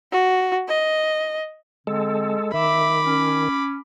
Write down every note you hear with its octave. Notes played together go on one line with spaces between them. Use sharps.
F#4
D#5
D3 G#3 C4 A4
D#3 E5 B5 D6
C#4